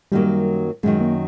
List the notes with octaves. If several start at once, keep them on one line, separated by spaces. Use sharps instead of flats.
F#2 D#3 F#3 G3 A#3
F#2 D#3 F#3 G#3
A#3